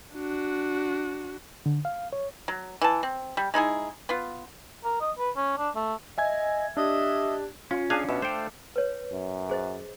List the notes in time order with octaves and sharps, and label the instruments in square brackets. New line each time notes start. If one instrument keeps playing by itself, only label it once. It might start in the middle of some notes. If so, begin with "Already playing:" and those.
[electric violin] D4 F#4
[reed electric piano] D3
F5
C#5
[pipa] F#3
E3 A5
C4
G3
G#3 D#4 E4 G#4
B3 F4
[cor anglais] A#4
D#5
B4
C#4
D4
A3
[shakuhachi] D#5 [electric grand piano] E5 G#5 G#6
[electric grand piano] D4 [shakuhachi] G4 [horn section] D#5 E5
[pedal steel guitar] C#4 [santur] F4
[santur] D4 [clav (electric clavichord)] G#4 F5 G#5
[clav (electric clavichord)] B2 [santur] E5
[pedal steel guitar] A3 A4 F5 [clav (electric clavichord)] C5 G5
[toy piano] B4 C#5
[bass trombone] F#2
[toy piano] G#4 C5 D#5